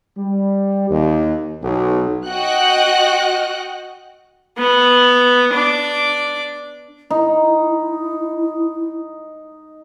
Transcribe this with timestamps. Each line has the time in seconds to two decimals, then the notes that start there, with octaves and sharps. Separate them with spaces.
0.17 G3
0.90 D#2
1.62 B1
2.27 F#4 D#5 F#5 G5 F#6
4.58 B3 B4
5.54 D4 D6
7.11 D#4 E4